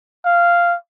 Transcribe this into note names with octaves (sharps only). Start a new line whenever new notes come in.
F5